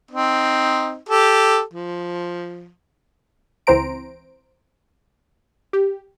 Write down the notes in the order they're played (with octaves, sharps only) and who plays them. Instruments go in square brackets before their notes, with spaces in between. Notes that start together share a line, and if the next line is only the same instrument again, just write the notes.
[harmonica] C4 D#4
G4 A4
F3
[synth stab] C#2 E3 C4 C5 A#5 D7
G4